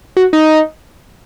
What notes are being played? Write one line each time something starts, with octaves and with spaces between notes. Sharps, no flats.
F#4
D#4